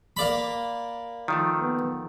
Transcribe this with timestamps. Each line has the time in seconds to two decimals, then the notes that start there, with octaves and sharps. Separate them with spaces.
0.17 A#3 D5 B5
1.28 D#3 F3 A3
1.60 B3